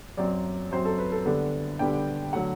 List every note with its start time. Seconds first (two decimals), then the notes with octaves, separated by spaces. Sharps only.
0.17 F#2 F#3 C4 D5
0.71 F#2 F#3 C4 C5
0.85 A4
0.98 B4
1.12 A4
1.25 D3 G3 B3 D4 A4
1.79 D3 G3 B3 D4 G5
2.33 D3 F#3 A3 F#5